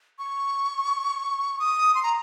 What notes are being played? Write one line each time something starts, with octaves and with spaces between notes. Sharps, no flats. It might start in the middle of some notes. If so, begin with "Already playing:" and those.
C#6
D#6
C6
A#5